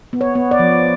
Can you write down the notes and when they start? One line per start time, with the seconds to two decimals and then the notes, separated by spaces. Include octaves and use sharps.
0.13 B3
0.21 C#5
0.35 B3
0.51 D5
0.59 F3